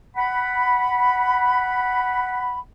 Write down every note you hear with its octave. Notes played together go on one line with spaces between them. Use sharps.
F#5 B5